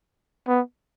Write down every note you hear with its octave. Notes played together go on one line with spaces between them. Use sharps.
B3